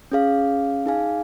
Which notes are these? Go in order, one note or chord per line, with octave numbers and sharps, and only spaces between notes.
C#4 G#4 F5
D#4 G#4 F5 G#5